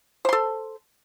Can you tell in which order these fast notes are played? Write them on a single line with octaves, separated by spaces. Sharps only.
C5 C6 A4